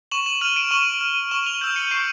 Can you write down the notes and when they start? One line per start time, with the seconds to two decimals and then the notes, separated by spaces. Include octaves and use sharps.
0.11 C#6 E7 F#7
0.26 E7 F#7
0.41 F6 D#7 F7
0.56 D7 E7
0.71 C#6 E7 F#7
1.01 F6
1.31 C#6 E7 F#7
1.46 F7 G7
1.61 E6 G6 E7 F#7
1.76 C#7 D#7
1.91 C#6 C7 D7